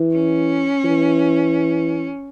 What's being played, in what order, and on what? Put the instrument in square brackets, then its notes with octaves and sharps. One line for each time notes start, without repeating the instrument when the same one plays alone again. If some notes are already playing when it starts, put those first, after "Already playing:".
Already playing: [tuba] E3
[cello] C#4
[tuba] E3